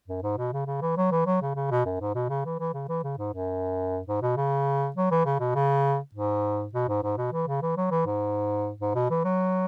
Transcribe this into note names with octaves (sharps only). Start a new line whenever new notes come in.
F#2
G#2
B2
C#3
C#3
E3
F#3
E3
F#3
C#3
C#3
B2
F#2
G#2
B2
C#3
E3
E3
C#3
E3
C#3
G#2
F#2
G#2
B2
C#3
F#3
E3
C#3
B2
C#3
G#2
B2
G#2
G#2
B2
E3
C#3
E3
F#3
E3
G#2
G#2
B2
E3
F#3